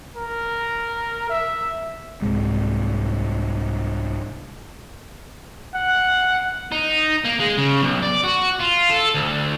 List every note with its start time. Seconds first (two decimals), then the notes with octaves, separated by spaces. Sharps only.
0.16 A#4
1.30 E5
2.22 C2 G#2 C3 G#3
5.75 F#5
6.72 D#4
7.25 A#3
7.40 G#3
7.58 C#3
7.82 B1
8.02 D5
8.24 F#4
8.60 F4
8.90 A4
9.15 D2